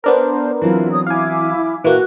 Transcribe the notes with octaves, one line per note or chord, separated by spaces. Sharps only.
B3 D4 A#4 C5
E3 F#3 C4 E4 F4
C#5 D#6
E4 F5 G#5 D6
A#2 E3 A#3 F#4 C#6 F#6